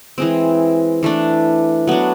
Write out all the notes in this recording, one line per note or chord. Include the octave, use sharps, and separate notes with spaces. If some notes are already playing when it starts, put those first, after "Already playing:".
E3 G#3 C4
E3 A3 D4
F#3 B3 D4